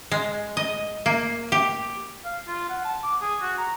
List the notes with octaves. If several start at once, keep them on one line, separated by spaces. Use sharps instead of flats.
G#3
D#5
A#3
G4
F5
F4
F#5
A5
D6
G#4
F#4
A#5